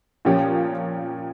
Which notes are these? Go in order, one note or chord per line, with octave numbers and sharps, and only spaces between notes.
A#2 F3 C#4 G4